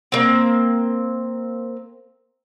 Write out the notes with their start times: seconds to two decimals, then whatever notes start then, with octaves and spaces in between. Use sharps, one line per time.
0.12 A#3 C4